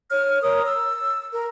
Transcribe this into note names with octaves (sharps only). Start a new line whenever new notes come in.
C#5 F6
A#4 C#5 D#6
E6
A#4